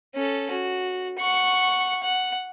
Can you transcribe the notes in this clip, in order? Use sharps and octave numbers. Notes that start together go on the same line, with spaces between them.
C#4 A4
F#4
F#5 C#6
F#5